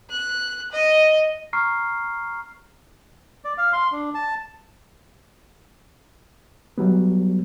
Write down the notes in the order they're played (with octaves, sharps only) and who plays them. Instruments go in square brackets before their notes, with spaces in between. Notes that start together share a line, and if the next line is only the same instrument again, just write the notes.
[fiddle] F#6
D#5
[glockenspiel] A#5 C#6 F6 C7
[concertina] D5
F5
C6
D4
A5
[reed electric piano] F#3 G3 B3